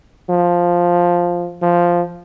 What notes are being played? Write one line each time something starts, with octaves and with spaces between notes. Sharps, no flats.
F3
F3